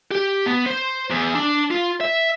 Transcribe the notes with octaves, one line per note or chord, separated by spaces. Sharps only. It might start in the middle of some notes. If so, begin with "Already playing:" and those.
G4
B3
C5
E2
D4
F4
E5